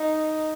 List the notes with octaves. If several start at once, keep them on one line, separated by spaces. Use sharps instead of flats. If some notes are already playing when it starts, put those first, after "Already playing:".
Already playing: D#4